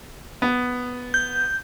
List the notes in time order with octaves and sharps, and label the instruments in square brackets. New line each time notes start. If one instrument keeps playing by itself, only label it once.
[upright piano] B3
[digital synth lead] G6